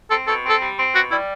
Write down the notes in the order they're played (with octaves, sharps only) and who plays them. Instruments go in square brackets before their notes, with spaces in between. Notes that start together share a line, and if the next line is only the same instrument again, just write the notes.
[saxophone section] C4 [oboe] A4
[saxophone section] B2 [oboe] A4
[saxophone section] C4
[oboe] A4
[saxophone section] G3
C4
[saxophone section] B2 [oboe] F#4
[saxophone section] G3 [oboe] E4